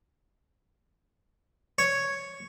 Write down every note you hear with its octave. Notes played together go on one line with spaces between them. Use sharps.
C#5